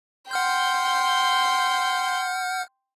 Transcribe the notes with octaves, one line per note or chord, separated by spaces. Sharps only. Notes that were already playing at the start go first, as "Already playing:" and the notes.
F#5 G5 C6 F6 G6